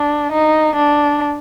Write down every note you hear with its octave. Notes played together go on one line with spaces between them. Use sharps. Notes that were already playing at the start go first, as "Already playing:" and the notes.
Already playing: D4
D#4
D4